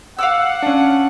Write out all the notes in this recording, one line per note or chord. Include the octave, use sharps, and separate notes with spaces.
F5 F#5 D6 E6
C#4 D4